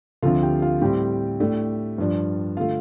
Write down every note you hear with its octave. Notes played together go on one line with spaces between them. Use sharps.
D2 D3 F3 C4 F4 F5
G4 G5
F4 F5
A2 G3 C4 G4 G5
A2 A3 D4
G2 F3 D4
D3 A3 F4 F5